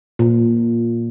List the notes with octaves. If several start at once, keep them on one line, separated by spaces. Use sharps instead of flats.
A#2